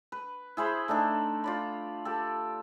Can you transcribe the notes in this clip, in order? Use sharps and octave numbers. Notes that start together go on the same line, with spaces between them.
B4
E4 G#4 C5 B5
A3 D4 D#4 A4
F4 D5 B5
G4 A4